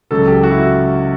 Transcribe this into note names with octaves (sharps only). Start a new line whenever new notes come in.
C#2 C#3 F#3 A4
G4
F#4
E4